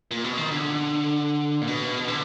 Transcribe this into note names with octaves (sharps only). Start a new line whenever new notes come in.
A#2
B2
D#3
D3
A#2
B2
D3